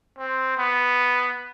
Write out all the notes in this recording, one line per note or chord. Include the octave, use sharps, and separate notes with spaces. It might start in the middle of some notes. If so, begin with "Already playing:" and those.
C4
B3